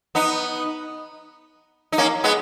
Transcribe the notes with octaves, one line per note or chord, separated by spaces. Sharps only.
B3 D#4
D#4
A#3 C#4
G#3 B3